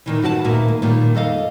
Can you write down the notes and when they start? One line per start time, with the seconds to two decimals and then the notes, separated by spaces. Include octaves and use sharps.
0.06 A#2 D#3 E3
0.22 G2 F#4 G#4 A5
0.44 D2 A#2 D#3 A#3 B4 E5
0.68 A#3
0.82 A#2 D#3 G3
1.15 F2 A4 D#5 F5